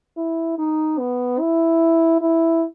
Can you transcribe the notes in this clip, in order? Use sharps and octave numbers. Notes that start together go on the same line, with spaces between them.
E4
D#4
B3
E4
E4